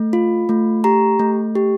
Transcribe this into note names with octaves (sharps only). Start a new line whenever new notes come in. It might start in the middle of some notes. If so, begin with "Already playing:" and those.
Already playing: A3
F4
A3
G4 A#5
A3
G4